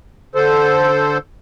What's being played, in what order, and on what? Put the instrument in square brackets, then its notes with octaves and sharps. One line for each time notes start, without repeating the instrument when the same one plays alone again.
[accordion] D3 A4 C5